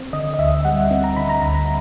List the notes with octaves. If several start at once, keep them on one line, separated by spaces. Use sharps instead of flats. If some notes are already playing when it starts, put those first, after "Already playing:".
Already playing: C4
D3 D#5
D#5
D2 E5
G3 F#5
C4
A#5
D3 B5
A#5
D2 A#5